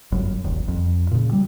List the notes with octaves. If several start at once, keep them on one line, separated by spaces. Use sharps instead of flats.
G1 F#2
D#1 G#1
F2
A#2 C#3
G3